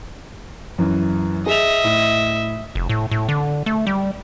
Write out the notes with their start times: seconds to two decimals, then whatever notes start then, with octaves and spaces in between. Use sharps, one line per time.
0.78 F#2 E3
1.46 G#4 D#5 E5 F7
1.84 A2
2.75 F1
2.89 A2
3.11 A2
3.29 D3
3.66 A3
3.87 G3